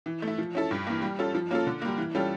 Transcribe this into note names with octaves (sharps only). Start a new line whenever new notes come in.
E3
A3
E4
F3
C#4 E4 A4
G2
E3 A#3
G3
C#4 F4 A4
F3
A#3 C#4 F4 A4
D3
G3 A#3
E3
G3 C#4 F4 A4